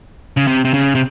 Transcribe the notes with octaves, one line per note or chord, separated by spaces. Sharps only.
C#3
C3
C3
C#3
C3